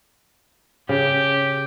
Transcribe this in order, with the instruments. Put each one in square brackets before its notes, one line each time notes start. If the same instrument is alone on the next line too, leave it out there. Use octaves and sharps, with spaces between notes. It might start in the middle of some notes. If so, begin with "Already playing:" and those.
[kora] C#3 [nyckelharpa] G4